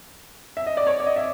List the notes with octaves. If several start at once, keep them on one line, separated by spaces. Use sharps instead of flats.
E5
D#5
D5
C#5
D5
D#5
E5